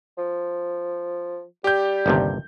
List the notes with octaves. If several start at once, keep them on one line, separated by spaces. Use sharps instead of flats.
F3
G3 G4 G6
G1 D#2 C3